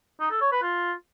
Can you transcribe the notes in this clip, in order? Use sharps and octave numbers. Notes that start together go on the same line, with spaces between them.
D#4
A4
C#5
B4
F4